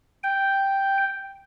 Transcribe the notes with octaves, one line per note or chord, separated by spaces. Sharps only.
G5